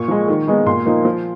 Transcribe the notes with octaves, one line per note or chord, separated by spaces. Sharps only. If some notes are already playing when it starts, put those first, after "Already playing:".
Already playing: A#2 C#6
F3 G#3
D#3
G#3 B3 D#4
A#2 C6
F3 A#3 D#4
F3